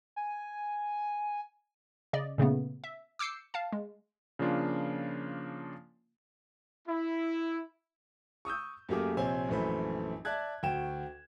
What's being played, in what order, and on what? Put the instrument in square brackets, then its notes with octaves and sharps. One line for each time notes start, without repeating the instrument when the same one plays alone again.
[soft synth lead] G#5
[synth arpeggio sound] C#3 D5 D#5
A#2 C#3 A3 B3
E5
D6 E6 G6 C7 C#7
F5 A5
G#3
[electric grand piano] C#3 F3 A#3 D4 F4
[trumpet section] E4
[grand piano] C#6 D#6 E6 G6
F#2 A3 A#3 G4 G#4 D6
A#1 C3 C5 C#5 G#5
A#1 F#2 E3 A3 C5 B5
D5 E5 A5 F#6 G#6
D2 F#4 G5 E7